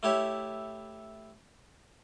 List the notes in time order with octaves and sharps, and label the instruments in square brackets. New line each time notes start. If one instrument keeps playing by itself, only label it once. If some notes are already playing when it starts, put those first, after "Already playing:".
[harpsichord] A3 E4 G4 C#5